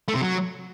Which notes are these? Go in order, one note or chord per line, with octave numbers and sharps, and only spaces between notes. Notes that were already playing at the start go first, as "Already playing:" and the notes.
A3
C3
F#3